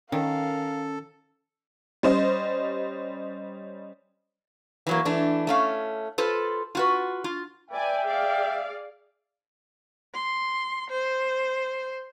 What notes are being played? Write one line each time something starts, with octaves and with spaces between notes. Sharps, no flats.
D#3 C#4 A4 A#4 F5
G3 C#4 C5 D#5
E3 F#3 A#3
E3 A3 D4
A3 C#4 F5
F4 A4 B4 C5
F4 F#4 B4
F4
B4 D5 E5 G5 G#5
G#4 D5 F5
C6
C5